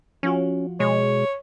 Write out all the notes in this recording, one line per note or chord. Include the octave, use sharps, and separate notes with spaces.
F3 C#4 F4 F#4
B2 G#3 C#5